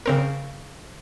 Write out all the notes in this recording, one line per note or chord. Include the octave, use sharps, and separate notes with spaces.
C#3 C4 A#4